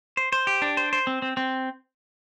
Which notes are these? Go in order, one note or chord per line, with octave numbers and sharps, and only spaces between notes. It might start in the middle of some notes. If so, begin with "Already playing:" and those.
C5
C5
G4
D4
C5
C5
C4
C4
C4